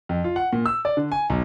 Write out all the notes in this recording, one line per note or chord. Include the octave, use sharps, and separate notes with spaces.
F2
F4
F#5
A#2
E6
D5
D3
G#5
B1